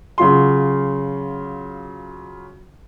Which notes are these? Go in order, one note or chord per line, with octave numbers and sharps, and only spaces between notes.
C#3 F#3 F4 C6